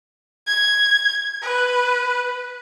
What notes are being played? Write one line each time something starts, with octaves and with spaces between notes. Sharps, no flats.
G#6
B4